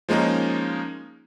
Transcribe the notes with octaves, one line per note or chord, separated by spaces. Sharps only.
F3 G#3 A#3 C#4 D#4